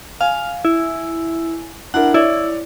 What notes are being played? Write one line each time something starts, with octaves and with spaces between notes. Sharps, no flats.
F5 G#5
E4
D4 E4 A#4 F#5
E4 C#5 D5